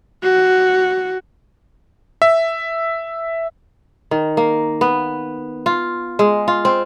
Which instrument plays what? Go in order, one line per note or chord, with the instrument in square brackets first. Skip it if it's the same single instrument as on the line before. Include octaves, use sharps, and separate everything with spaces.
[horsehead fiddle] F#4
[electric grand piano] E5
[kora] D#3
A#3
B3
F4
G#3
F4
C4